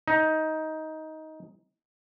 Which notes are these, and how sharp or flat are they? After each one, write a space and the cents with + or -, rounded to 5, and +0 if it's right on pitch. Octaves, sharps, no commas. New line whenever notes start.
D#4 +15